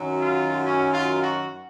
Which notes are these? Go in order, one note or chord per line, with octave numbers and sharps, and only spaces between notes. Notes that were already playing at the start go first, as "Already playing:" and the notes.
Already playing: F#2 D#3 F#3
F4
C#4
F4
F#4